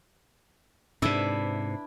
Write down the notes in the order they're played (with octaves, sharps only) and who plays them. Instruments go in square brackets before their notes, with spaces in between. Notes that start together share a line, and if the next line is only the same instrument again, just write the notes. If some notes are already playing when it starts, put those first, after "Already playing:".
[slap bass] G#2 C3 [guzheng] D4 E4 B4